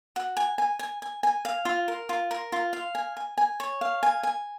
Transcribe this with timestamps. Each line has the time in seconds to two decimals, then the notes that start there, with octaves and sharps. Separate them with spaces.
0.16 F#4
0.37 G#5
0.58 G#5
0.79 G#5
1.02 G#5
1.23 G#5
1.45 F5
1.65 F4
1.88 A#4
2.09 F4
2.31 A#4
2.52 F4
2.73 F5
2.95 G#5
3.17 G#5
3.38 G#5
3.60 C#5
3.81 F5
4.03 G#5
4.23 G#5